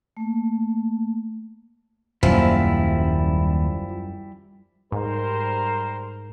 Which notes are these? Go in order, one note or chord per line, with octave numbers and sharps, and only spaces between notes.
A3 A#3
D#1 F#2 F3 G3 A#3 E4
G#2 G3 A#4 C5